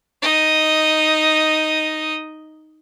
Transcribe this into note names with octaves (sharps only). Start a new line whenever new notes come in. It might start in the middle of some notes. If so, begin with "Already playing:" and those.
D#4 D#5